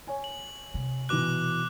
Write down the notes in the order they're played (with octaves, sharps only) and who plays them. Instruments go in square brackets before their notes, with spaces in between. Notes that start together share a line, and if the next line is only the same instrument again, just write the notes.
[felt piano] C#5 G#5
[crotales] F#7
[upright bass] C3
[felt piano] B2 E3 [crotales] D6 F#6